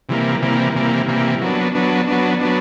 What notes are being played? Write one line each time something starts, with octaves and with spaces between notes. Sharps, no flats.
C3 E3 G3 A#3
C3 E3 G3 A#3
C3 E3 G3 A#3
C3 E3 G3 A#3
F#3 B3 D4
F#3 B3 D4
F#3 B3 D4
F#3 B3 D4